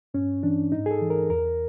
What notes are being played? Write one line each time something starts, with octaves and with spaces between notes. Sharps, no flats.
G2 C#4
E3 D4
G#2 D#4
G#4
A4
E3
A#4
E2 A#4